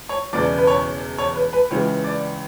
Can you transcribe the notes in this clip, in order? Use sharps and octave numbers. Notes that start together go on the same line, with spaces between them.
C#5
E1 E2 C#3 E3 D5
B4
C#5
C#5
B4
B4
C#2 C#3 E3
D5